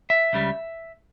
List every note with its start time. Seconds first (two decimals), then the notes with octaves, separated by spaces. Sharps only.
0.10 E5
0.33 C#2 C#3 G3